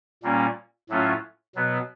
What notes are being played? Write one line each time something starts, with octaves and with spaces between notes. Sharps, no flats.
A#2 G3 A#3 C#4
A2 F#3 A3 C#4 F4
B2 F#3 B3